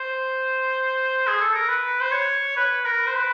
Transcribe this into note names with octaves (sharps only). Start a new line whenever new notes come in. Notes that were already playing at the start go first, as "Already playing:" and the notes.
Already playing: C5
G#4
A4
A#4
B4
C5
C#5
B4
A#4
C5
B4